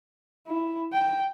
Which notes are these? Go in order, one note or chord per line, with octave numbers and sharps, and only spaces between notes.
E4
G5